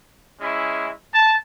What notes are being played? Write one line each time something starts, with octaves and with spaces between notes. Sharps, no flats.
G#3 C#4 E4
A5